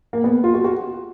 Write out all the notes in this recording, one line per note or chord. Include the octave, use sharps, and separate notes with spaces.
A#3
B3
F4
F#4
F#4